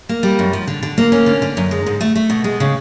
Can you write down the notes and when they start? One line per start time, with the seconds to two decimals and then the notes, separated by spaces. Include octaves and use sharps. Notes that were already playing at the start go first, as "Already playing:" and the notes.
0.09 A#3
0.23 G3
0.39 F#2
0.53 F3
0.67 D3
0.83 D3
0.98 A#3
1.12 C#4
1.26 D3
1.42 D3
1.57 F#2
1.71 G#3
1.86 G#2
2.01 A3
2.15 A3
2.30 B2
2.44 G#3
2.60 C#3